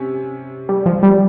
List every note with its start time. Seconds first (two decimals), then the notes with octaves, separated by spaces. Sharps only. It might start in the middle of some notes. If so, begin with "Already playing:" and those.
Already playing: C3 C#4
0.69 G3
0.86 F3
1.03 G3